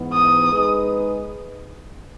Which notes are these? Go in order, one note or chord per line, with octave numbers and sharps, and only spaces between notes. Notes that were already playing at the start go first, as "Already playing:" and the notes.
Already playing: G#2 E3 B3
D#6
G#3 D#4 G#4 B4 D#5